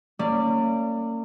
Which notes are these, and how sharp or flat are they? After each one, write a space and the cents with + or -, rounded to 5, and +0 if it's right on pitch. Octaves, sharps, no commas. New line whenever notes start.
A#3 -35 C#4 +0 D5 +0